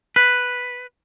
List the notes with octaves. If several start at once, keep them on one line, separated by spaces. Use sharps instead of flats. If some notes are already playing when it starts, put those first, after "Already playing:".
B4